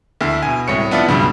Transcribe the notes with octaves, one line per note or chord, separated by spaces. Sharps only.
D2 E4
B2 G#5
C2 A2 C#5 C#7
B3 D4 E4 F4
C#2 G2 B2